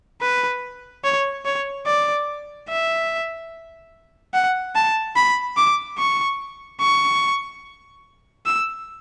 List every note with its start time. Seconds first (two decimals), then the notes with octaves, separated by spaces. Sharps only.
0.22 B4
1.04 C#5
1.45 C#5
1.86 D5
2.69 E5
4.34 F#5
4.75 A5
5.16 B5
5.57 D6
5.99 C#6
6.81 C#6
8.46 E6